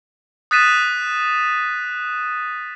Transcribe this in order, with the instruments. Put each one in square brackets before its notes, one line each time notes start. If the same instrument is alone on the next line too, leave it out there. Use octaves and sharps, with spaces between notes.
[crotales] D#6 F#6 A6 B6 D#7 E7